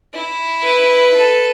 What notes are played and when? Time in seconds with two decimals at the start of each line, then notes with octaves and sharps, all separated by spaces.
0.13 E4
0.64 B4
1.14 A4